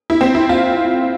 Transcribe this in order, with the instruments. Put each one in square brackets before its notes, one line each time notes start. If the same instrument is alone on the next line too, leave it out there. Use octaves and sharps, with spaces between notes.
[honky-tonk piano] E4
C4
E4
F4